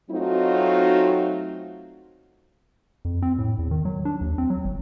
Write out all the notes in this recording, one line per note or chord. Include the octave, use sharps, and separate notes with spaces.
F#3 A3 C4 D#4 F4 F#4
F2
C4
A2
E2
D#3
F#3
D4
D#2
C4
F#3
G1